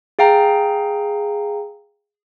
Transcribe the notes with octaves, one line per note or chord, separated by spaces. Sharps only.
G#4 F5 G5 A#5